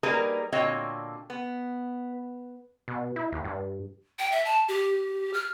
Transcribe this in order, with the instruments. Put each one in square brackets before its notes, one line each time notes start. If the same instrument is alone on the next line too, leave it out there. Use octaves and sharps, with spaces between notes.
[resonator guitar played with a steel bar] G3 A#3 D#4 G#4 A#4 B4
A#2 D3 C4 F#4 C#5 D#5
B3
[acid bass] B2
E4
D#2
G2
[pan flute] G5
E5
A5
G4
F6